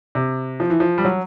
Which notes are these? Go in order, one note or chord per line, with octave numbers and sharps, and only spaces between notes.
C3
F3
E3
F3
G3
F#3